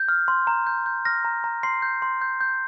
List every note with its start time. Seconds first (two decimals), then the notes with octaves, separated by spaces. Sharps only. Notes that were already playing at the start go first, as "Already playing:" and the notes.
Already playing: G6
0.08 F6
0.28 C6
0.47 A#5
0.67 G6
0.86 G6
1.05 F6 A#6
1.25 A#5
1.44 A#5
1.63 C6 C7
1.82 G6
2.02 C6
2.22 G6
2.41 G6